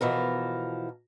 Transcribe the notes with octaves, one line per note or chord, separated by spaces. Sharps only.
B2 E3 F3 A#4